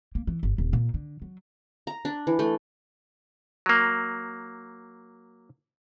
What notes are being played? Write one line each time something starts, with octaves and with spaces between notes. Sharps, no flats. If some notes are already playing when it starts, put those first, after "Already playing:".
A#3
E3
G1
D#1
A#2
D3
F#3
A#5
D4
E3
A3
F#3 A#3